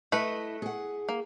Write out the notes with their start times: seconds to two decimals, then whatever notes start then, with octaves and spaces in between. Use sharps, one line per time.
0.12 A3 E4 B4 D#5
0.62 G#4 F#5
1.09 A#3